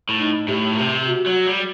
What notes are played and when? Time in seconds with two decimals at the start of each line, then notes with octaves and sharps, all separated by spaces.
0.09 A2
0.19 D#4
0.48 A2 G4
0.73 A#2
0.79 C3
1.08 F#4
1.26 F#3
1.47 G3